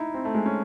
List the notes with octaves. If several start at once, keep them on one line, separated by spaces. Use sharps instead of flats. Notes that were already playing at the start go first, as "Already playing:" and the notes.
Already playing: D#4 E4
C4
A3
G#3
C#4